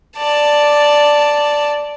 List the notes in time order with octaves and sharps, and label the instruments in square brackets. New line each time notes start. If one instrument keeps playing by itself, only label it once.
[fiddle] D5 A5